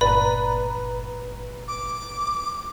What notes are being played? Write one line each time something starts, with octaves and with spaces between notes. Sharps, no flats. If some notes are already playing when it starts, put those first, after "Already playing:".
G1 A#2 B4 D5 A#5 B5
D6